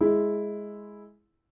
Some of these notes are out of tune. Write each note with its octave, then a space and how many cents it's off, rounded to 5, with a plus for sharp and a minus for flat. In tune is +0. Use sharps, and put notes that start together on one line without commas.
G#3 +0 E4 +0